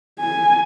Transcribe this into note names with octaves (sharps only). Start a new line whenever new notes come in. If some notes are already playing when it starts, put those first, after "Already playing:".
G#5